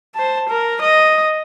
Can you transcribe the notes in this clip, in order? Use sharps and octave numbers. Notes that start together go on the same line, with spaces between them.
C5 A5
A#4
D#5